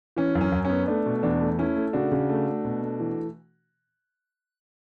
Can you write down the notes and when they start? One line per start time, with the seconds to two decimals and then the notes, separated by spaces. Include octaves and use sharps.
0.17 E3 C#4
0.35 F#2
0.41 C#4
0.52 F#2
0.65 B3 C#4
0.87 A3 D4
1.06 B2
1.23 E2 D4
1.41 A3
1.58 A3 C#4 E4
1.76 A3
1.93 C#3 D4 F#4
2.12 C#3
2.30 A3
2.47 A3
2.65 B2
2.82 A3
3.00 E3